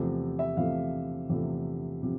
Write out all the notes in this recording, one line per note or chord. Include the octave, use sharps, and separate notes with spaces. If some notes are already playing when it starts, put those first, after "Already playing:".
Already playing: E2 C3 F3 A3
E5
E2 C3 F3 A3 F5
E2 C3 F3 A3
C3 F3